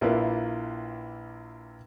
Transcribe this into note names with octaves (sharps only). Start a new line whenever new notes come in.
A#1 A#3 E4 F4 B4